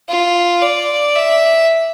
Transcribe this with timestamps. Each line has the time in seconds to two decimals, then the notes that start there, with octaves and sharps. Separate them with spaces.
0.09 F4
0.62 D5
1.16 E5